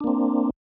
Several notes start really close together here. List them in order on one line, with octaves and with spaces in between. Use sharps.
D4 A#3 C4